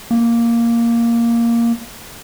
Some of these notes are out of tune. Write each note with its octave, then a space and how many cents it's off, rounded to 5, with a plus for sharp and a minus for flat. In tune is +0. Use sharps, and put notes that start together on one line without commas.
A#3 +0